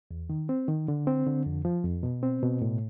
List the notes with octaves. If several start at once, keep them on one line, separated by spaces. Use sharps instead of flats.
E2
D#3
C4
D#3
D3
C4
D3
F2
F3
F2
B2
C4
B2
A2